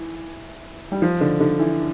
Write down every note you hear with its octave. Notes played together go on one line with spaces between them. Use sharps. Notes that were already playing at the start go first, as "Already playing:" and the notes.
Already playing: E3
G3
F3
D3
D3
E3